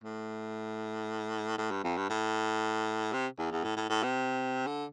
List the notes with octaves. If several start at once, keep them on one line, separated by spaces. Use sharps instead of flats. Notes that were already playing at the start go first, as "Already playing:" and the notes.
A2
A2
G2
F2
G2
A2
C3
E2
E2
A2
A2
A2
C3
D3